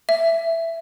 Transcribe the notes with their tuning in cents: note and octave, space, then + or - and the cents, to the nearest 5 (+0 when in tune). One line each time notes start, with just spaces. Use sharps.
E5 +5